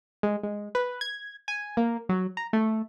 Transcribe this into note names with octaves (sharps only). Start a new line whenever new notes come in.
G#3
G#3
B4
G#6
G#5
A#3
F#3
A#5
A3